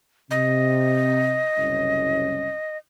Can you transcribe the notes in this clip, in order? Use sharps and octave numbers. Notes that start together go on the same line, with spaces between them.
C3 D#5
F#1 C2 C#4